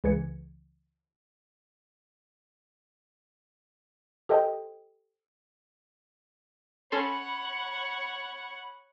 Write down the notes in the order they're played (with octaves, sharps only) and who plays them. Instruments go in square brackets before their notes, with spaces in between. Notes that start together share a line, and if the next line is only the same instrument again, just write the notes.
[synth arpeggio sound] C#2 C#3 E3 G#6 C#7
G4 A4 C5 D#5 G5
[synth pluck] C#4 A4 C6 [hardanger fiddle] C#5 F#5 [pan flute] B5